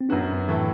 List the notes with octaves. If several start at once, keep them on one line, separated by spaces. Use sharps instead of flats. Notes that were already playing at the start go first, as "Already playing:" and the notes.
C4
F#2 F#3 B3 D4 F#4
A2 E3 A3